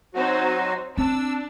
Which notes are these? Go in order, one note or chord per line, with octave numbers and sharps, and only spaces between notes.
F#3 C4 D#4 F#4 C5
C4 D4 E6